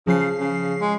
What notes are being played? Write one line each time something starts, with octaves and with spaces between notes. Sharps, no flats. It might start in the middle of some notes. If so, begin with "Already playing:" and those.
C#3 F3 C7
C#3
G#3